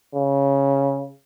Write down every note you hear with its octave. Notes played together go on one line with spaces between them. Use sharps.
C#3